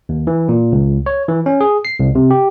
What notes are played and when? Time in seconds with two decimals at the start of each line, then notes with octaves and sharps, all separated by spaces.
0.09 D#2
0.27 E3
0.49 A#2
0.72 C#2
1.06 C#5
1.28 E3
1.46 C#4
1.61 G#4
1.85 C7
2.00 C2
2.15 C3
2.31 G4